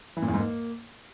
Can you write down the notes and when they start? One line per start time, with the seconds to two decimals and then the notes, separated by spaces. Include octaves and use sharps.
0.17 E3
0.22 A#2
0.28 E2
0.34 G#2
0.39 A#3